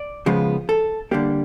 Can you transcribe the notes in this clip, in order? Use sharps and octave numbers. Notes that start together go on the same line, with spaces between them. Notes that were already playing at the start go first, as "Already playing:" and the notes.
Already playing: D5
C#3 F3 G#3 B3
A4
D3 G3 A#3 G4